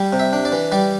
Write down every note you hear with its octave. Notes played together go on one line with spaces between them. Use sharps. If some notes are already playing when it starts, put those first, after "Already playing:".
Already playing: G3
C3
E5
D4
D5
E3
G3 D5